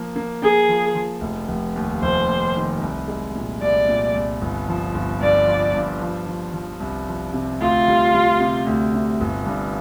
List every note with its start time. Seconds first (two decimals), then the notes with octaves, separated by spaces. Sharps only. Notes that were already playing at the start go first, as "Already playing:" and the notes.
Already playing: F3 A#3
0.16 A#3
0.42 A#3 G#4
0.69 F3
0.95 F3
1.21 F1
1.48 F1
1.76 D#2
2.02 F1 C5
2.29 D#2
2.55 D#3
2.81 C2
3.08 G#3
3.35 A#2
3.61 C2 D5
3.88 A#2
4.15 C2
4.41 G1
4.68 F3
4.94 G1
5.21 G2 D5
5.47 F3
5.74 G2
6.01 F3
6.27 F3
6.53 F3
6.80 C2
7.08 F3
7.33 C3
7.60 D2 F4
7.88 G3
8.14 G3
8.40 C3
8.66 D2
8.94 C3
9.21 G1
9.46 G2